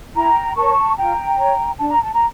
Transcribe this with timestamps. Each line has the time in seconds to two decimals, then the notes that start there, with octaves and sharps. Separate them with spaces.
0.15 E4 G5 A#5
0.56 A#4 C#5 A5 C#6
0.97 F4 G5 A#5
1.38 C#5
1.79 D4 A5
1.91 A#5
2.03 A5
2.14 A#5